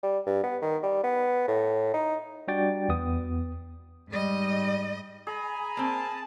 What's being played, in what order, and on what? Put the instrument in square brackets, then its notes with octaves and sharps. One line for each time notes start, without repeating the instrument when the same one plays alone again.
[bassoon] G3
G2
B3
D#3
G3
B3
A2
D#4
[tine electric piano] G3 D4 F#4 D5 G5 A6
E2 B3 D#6
[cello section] G#2 D#5 [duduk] G3
[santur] G#4 [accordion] G#5 A#5 B5
[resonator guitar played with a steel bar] A#3 C4 [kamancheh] A5